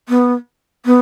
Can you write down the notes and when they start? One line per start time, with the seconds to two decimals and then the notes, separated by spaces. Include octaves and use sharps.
0.09 B3
0.86 B3